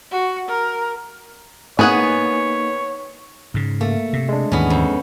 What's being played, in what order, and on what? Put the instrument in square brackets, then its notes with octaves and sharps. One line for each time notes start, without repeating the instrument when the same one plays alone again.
[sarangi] F#4
A#4
[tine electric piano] A#3 D#4 [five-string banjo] B3 G#4 F#5 [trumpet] C#5 [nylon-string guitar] G#5
[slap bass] G#2 C#3
[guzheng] A3 [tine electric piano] A#3
[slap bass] C3
[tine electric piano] G#3 D4
[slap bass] D#2 G#2 E3 [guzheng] B3 C#4
[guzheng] F2